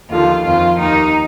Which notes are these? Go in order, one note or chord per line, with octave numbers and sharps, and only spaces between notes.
D#2 D3 F3 F4
F2 D#3 F4
D#2 D#3 D#4